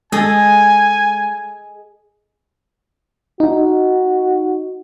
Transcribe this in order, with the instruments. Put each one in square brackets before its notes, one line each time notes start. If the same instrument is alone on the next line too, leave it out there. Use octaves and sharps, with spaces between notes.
[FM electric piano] G#3 [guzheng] G#4 A4 D#5 [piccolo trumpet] G#5
[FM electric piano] D#4 [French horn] F#4